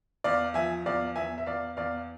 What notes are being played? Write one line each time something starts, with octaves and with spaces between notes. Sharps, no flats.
E2 D5 F5
F3 E5 G#5
E2 D5 F5
E2 E5 G#5
E5
E2 D5 F5
E2 D5 F5